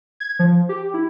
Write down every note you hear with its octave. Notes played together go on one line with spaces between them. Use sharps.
G#6
F3
G4
E4